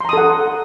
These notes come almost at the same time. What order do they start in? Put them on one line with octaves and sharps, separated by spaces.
C6 A#5 D#6 A4 F#5